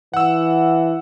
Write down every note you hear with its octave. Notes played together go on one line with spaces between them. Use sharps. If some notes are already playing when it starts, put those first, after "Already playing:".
E3 F#5 E6